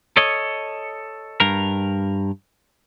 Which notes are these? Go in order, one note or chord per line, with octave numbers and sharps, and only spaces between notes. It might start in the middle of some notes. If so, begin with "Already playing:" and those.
A4 C#5 D#5
G2 A#4